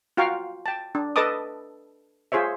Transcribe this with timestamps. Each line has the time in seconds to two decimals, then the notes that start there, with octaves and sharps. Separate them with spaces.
0.17 F4 F#4 F5 G5 A#5 C#6
0.66 G5 A5
0.95 D4
1.16 A4 B4 D#5 A5 D6 D#6
2.32 F4 G#4 C5 C#5 E5